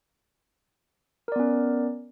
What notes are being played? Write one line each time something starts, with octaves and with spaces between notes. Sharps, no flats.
B3 C#4 A#4 D5